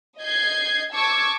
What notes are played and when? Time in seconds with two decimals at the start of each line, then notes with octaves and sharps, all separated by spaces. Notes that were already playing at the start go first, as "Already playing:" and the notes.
0.20 D#5 G6 G#6 C7
0.94 A5 C#6 D6 E6 G#6